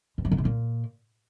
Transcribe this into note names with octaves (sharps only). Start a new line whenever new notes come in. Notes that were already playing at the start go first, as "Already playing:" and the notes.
G2
F#3
D3
C3
A#2